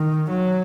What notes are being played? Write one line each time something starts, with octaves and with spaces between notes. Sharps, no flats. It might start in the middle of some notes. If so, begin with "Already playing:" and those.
Already playing: D#3
F#3